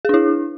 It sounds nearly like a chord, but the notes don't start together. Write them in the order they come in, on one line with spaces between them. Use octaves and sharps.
G#4 D4 E4